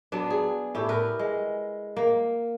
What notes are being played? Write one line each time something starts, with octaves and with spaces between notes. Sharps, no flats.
F#3 B3 D4
G#4
A2 E4 G4
A#4 B4
G#3
A#3